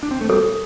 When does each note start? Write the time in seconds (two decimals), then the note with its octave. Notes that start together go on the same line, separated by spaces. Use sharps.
0.03 D4
0.11 C4
0.21 A3
0.29 G3 A4